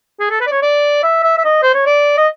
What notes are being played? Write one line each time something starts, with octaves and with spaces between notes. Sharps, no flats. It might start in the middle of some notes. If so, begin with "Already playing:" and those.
G#4
A4
B4
D5
C#5
D5
E5
E5
E5
D#5
C5
C#5
D5
D#5